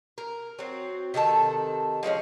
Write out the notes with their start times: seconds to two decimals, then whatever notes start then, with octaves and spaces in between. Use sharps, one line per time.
0.18 A#4
0.59 F#3 C4
1.14 C3 D#3 A4 A5
2.03 F3 G#3 B3 C#4